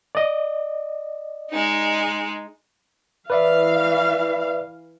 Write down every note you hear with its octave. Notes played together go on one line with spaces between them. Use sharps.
D5 D#5
G#3 D#4
E3 B4 D5 E5 F5